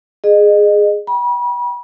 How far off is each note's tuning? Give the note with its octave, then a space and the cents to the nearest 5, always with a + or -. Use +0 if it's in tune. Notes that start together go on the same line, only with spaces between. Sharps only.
G#4 +0 D#5 -30
G5 +0 B5 -35